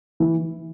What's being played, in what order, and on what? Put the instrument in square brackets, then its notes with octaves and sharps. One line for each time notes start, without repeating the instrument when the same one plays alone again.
[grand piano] E3